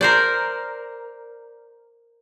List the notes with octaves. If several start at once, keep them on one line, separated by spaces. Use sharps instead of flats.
A#4 C5 D5